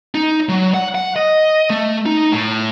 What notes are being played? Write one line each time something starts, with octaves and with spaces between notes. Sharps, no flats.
D#4
F#3
F#5
F#5
D#5
A3
D#4
A2